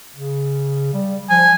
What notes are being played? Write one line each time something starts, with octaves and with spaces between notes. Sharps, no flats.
C#3
G3
F3 G#5